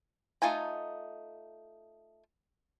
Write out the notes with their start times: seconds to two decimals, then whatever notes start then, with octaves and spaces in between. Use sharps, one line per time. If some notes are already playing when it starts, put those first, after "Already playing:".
0.42 A3 D#4 F4 G#5 A#5